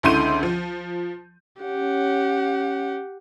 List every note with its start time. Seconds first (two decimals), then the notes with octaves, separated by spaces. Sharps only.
0.03 C#2 D3 E4 C6 G6 D#7
0.43 F3
1.62 C#4 G4 F#5